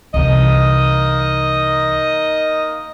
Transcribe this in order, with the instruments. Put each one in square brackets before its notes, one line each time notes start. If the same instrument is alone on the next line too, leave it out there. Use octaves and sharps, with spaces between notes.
[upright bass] C2 E3 [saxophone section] A#3 D#4 D#5